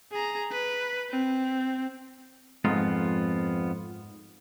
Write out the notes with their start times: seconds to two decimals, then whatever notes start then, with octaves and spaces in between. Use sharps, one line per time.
0.12 G#4 A#5
0.51 B4
1.10 C4
2.65 F2 G#2 B3 F4